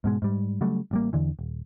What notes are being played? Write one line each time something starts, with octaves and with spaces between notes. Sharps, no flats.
G#2 B2 G#3
G#2 G3
C#3 F#3 G3 A3
A1 G3 A#3
E2 D3 E3
D#1